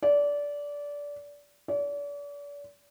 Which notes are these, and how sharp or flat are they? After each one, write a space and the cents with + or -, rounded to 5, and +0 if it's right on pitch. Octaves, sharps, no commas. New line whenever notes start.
D5 -20
D5 -40